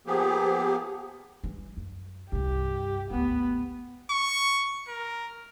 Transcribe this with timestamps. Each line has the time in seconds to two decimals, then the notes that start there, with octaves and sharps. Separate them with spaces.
0.07 F3 A#3 B3 G4 G#4
1.44 E3 G3
1.77 F#2
2.32 C2 G2 G4
3.10 G#1 D2 B3
4.11 C#6
4.88 A#4